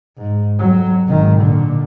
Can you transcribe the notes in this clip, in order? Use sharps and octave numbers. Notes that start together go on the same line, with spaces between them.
G#2
F2 F#3
G#1 D#3
A#2 D3